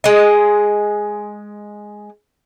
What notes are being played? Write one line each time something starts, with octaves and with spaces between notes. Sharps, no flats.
G#3 D#5